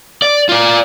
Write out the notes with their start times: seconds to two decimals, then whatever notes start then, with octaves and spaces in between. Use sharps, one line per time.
0.22 D5
0.49 F4 D5